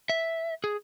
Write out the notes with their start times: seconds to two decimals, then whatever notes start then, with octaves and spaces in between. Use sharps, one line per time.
0.09 E5
0.64 G#4